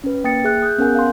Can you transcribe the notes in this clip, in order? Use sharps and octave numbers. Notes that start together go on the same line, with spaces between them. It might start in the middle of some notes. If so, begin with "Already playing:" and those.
C#4 B4
A#3 G5 D#6 A6 C#7
G#4 E5 F#6
G#4 D#6 F#6 G6
B3 C#4 A#4 F#5 G#5 G6
F5 C6